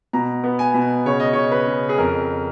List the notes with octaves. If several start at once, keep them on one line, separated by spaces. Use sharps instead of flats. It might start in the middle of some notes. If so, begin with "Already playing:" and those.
B2 A#5
B3
G#5
B2
C#3 C#5
D#5
C#5
C#3
B4
C#3
G#4
F2 A#4